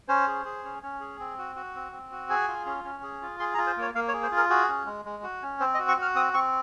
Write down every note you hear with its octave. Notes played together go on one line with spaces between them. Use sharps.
C#4 C5
G#4
G#4
C#4
C#4
G#4
C4
F#4
F#4
C4
C4
F#4
G#4 G#5
F4
C#4
C#4
G#4
F4
G#4 C6
A#5
F4
C5
A#3 C#5
A#3 F5
C#5
G#4
C5
F4
A#4
F#4 G#4
C#4
G#3
G#3
F#4
C#4
C4 C5
D#5
F#4
C#6
F#4 F6
C4 D#6
C4 C#6